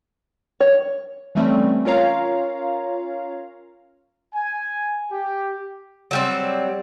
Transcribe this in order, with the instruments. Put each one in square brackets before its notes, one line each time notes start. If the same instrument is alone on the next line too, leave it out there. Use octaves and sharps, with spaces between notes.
[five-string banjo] C#5
[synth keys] E3 G3 A3 C4 C#4
C#4 F4 A#4 C#5 F5 A#5
[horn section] G#5
G4
[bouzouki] F#3 G3 C4